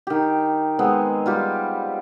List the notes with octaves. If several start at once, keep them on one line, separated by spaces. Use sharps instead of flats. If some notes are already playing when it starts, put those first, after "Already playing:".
D#3 G4
G#3 B3 C4
G3 F4 G4